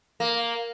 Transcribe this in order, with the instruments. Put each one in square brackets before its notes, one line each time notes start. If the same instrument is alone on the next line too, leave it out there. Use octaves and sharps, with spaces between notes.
[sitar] A#3